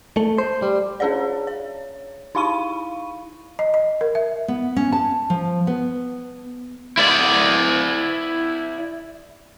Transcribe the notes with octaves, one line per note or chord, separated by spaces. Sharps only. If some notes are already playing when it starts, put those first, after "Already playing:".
A3
C5
G3
C#4 D4 G#4 C#5 D5
C#5
D#4 E4 F5 B5 C#6 D#7
D#5
D#5
A#4
E5
B3
C#4
A5
F3
B3
E4 D5